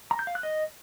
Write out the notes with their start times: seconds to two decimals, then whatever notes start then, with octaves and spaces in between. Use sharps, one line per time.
0.11 A#5
0.19 G6
0.27 F5
0.35 F#6
0.43 D#5